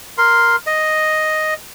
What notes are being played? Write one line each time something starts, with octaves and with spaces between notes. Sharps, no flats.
A#4 C6
D#5